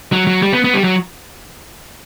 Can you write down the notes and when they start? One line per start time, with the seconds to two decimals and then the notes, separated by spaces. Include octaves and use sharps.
0.12 F#3
0.27 F#3
0.42 G3
0.53 B3
0.64 B3
0.74 G3
0.84 F#3